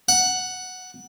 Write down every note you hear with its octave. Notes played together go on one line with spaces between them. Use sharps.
F#5